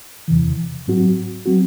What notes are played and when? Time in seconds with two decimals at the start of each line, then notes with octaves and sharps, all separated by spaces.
0.28 E2 C3 E3
0.87 G#2 F#3 C4 F#4
1.46 F#3 C4 F#4